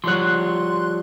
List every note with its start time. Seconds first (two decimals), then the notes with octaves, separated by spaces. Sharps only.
0.04 F3 G3 C#5 C6 F#6